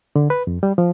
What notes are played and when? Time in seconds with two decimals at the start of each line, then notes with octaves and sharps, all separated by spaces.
0.16 D3
0.30 B4
0.47 F2
0.63 G3
0.78 F3